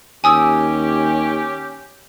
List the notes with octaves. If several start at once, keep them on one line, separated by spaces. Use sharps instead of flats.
D#2 C#4 G4 G#5 D#6 E6